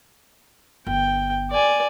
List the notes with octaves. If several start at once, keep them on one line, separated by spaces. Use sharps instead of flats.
G1 G5
D5 G#5